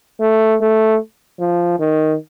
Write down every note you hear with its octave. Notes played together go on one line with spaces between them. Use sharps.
A3
A3
F3
D#3